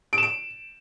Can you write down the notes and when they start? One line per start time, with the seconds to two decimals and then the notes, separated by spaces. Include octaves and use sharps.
0.13 D7
0.18 E7
0.23 D7